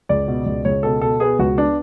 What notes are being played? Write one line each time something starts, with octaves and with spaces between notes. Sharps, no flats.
C#2 D5
B2
C#2
C#2 C#5
B2 A4
B2 A4
B3 G#4
C#2 F#4
B3 D4